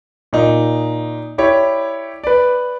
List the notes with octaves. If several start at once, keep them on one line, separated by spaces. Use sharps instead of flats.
A#2 D#4
E4 G4 C#5 D5
B4 D5